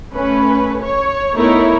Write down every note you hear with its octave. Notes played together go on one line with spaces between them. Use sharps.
A3 C#4 B4
C#5
A3 B3 D#4 E4 A#4 C#5